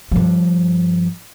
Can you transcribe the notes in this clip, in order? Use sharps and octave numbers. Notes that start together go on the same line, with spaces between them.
G2 F3